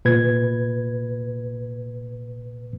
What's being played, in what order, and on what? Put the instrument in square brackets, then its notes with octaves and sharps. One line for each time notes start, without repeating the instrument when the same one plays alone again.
[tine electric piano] A#2 B4 G#6